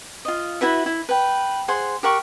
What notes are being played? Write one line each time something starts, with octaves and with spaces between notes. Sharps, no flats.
F4 D#5
E4 F#4 B4 E5
E4
B4 G5
G#4 C5 F#5 C6
G4 A#4 F#5 C#6